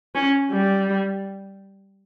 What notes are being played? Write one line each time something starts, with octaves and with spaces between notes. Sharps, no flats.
C#4
G3